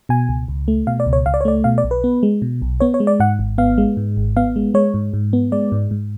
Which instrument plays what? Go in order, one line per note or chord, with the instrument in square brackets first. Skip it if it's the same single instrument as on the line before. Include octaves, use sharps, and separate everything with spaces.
[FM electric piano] B2 G#5
C#2
C#2
A3
B2 F5
D5
C#2
C#5
C#2 F5
D5
C#5
A3 D5
B2 F5
D5
B1
B4
B3
G#3
B2
B1
B3 C#5
C#5
G#3
D5
G#2 F#5
G#1
B3 F5
G#3
G#2
G#1
B3 F5
G#3
G#3 C#5
G#2
G#2
B3
G#3 D5
G#2
G#2